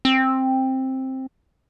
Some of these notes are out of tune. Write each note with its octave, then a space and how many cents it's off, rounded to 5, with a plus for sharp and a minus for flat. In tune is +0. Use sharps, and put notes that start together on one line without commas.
C4 +10